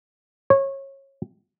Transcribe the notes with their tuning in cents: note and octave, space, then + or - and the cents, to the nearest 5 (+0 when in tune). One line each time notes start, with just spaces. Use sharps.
C#5 -25